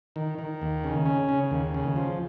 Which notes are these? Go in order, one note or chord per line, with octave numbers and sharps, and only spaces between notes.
D#3
D#3
D#2
C#3
C#4
C#3
D#2
C#3
F3